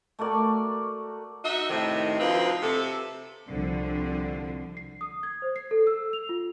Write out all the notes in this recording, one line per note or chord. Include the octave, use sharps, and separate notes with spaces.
A3 F#4 A#4 D5
D#4 F#4 D#5 E5
A2 C3 D#3
D2 F3 C4 D#4 B4 F5
C3 A4
C2 D3 F3
C7
D#6
G#6
C5
C7
A4
E6
F7
F4